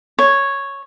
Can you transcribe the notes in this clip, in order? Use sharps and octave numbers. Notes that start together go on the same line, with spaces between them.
C#5